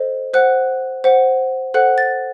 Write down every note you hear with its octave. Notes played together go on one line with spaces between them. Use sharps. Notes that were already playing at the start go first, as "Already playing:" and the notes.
Already playing: A4 C5 D#5
C5 F#5 F#6
C5 F#5
A4 C5 F#5 F#6
A6